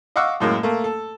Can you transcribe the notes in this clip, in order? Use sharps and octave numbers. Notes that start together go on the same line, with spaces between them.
D#5 F5 F#5 C#6 D6 E6
F#2 A2 G#3 A#3
A3 A#3
A4